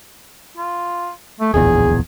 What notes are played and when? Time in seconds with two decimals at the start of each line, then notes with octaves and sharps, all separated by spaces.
0.57 F4
1.41 A3
1.54 D1 A#1 E2 G#4